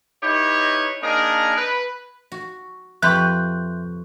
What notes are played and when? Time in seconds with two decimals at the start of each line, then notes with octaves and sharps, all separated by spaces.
0.23 D#4 E4 G4 B4 C#5
1.02 A#3 D4 D#4 G#4 A#4
1.57 B4
2.32 F#4
3.02 F2 G4 B4 E5 C6 C#6 F#6 G6